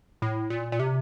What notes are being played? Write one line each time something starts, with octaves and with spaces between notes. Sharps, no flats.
A2
A#2
A#2
C3